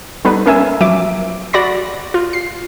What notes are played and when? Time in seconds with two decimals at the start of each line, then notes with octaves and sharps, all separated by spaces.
0.25 G3 B3 D#4 A4 B4
0.46 A#3 C#4 A#4 E5 G#5 E6
0.81 F3 F#3 E5 D6
1.53 F#4 D5 B5 A#6
2.14 F4
2.33 C7